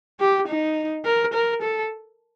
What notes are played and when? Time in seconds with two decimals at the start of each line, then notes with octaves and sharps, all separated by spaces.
0.20 G4
0.48 D#4
1.05 A#4
1.34 A#4
1.62 A4